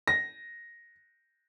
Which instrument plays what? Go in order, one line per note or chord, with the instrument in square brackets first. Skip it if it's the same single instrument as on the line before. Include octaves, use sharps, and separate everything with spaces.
[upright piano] A#6